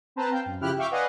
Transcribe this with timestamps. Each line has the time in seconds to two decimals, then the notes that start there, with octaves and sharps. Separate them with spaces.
0.16 C4 B4 C5 A5 A#5
0.31 F5 G5
0.46 F#2
0.60 C#3 F3 E4 G4 F6 F#6
0.78 E5 F5 G5 C#6 D6
0.91 B4 D5 D#5 F5 F#5 G#5